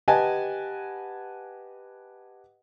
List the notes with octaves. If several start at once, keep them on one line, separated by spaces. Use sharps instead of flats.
G4 B4 D#5 F#5 G#5 A5